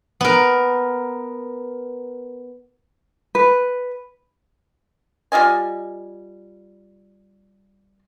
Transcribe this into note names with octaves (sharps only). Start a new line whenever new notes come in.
B3 A#4
B4
G3 F4 D#5 G#5